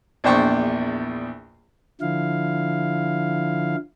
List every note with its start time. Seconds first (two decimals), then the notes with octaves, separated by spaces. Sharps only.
0.24 A#1 E2 D4 C5 G5 C#6
2.01 D3 F3 E4 F5